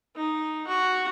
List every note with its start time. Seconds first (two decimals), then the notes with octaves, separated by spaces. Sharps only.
0.16 D#4
0.67 F#4